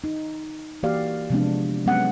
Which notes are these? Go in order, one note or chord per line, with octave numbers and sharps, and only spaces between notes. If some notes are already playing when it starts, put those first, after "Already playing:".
D#4
E3 A#3 F#4 G4 D5 F5
C3 F3 G#3 B3 C4 D4
F#3 G#3 B3 C#4 F#5